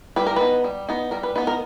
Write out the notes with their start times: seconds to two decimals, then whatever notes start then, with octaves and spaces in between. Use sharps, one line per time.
0.16 G3 B4
0.26 A#4
0.36 B3 D#4 B4
0.64 G3
0.89 B3 D#4
1.11 G3 A#4
1.23 B4
1.36 B3 D#4 B4
1.47 A#4